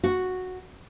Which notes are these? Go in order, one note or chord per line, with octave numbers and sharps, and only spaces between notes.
F#4